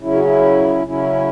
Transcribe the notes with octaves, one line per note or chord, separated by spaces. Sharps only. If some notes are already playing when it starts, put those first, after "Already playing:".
C#3 F#3 C#4 E4
F#4
E4
C#3 F#3 C#4 E4